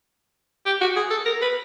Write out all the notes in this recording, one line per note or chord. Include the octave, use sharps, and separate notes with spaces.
G4
F#4
G#4
A4
A#4
B4